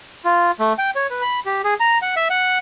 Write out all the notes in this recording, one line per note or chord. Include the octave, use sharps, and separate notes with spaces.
F4
A3
G5
C#5
B4
B5
G4
G#4
A#5
F#5
E5
F#5